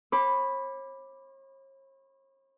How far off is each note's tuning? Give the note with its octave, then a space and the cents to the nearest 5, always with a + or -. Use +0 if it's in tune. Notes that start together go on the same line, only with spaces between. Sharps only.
C#5 -45 B5 +0 D6 +0